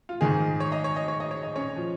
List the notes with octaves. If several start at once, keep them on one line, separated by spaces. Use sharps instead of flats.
F4
G#2 D#3 G#4
C#5
D#5
C#5
D#5
C#5
D#5
C#5
D#5
C#4 C#5
F3